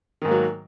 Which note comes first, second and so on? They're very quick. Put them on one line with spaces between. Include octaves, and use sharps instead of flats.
D#3 G#2 A#3 F#3